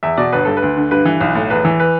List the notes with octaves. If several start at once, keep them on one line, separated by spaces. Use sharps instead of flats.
E2 E5
B2 D5
G1 B4
G2 A4
B4
D2
D3
G2 B4
E3
B1
A2
E2 B4
E3
B4